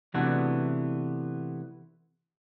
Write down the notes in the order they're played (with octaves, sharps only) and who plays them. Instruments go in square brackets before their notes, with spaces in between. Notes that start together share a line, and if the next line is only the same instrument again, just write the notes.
[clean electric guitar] C3 E3 A3 B3 D4 F#4